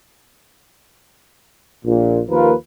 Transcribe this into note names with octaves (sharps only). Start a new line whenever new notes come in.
A#1 A#2
D#2 F3 A#3 F4 A#4 B4